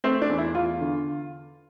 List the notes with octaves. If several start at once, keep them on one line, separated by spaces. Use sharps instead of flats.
A3 C4
D4
E2
E4
E2 F4
D3